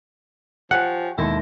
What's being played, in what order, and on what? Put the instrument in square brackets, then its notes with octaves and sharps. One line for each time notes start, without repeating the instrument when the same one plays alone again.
[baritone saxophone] F3 [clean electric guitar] G4 C#5 G#5 [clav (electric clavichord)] F#5
[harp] D#2 G6 A#6 [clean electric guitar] B2 G#3 A4 [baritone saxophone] E4